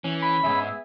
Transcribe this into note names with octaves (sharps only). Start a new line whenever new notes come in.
E3 C#4
B5
E2 G#2 B3 G#4 E5